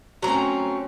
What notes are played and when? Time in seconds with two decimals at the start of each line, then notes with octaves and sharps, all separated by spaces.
0.22 F#3 A3 C4 C#4 A#5